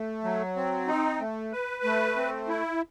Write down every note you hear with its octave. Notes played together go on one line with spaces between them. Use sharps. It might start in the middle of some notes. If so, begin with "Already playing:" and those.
Already playing: A3
F#3
C4
D#4
A3
B4
A3
C4
E4